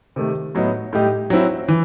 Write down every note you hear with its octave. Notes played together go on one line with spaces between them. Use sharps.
C3 D#3 A3
A2 F#3 B3 D#4
A2 G3 D#4 G4
F#3 C4 E4
E3